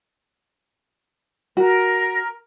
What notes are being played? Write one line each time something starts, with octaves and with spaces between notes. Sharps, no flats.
F#4 A#4